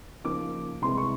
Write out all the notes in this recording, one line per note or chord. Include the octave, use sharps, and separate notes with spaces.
C#3 F3 A#3 D#4 D6
C2 C3 E3 G#3 C6
C#6